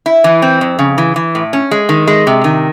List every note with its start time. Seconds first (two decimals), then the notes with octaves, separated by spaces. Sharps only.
0.06 E4
0.24 E3
0.42 C4
0.61 F2
0.79 C#3
0.98 E3
1.16 E3
1.35 A2
1.53 C#4
1.71 G#3
1.89 D#3
2.07 G#3
2.27 C3
2.44 D#3